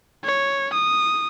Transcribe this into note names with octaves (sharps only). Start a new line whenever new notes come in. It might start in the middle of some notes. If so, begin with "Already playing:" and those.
C#5
D#6